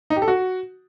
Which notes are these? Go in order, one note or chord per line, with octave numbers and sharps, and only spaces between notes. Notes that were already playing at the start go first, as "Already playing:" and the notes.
D#4
G4
A4
F#4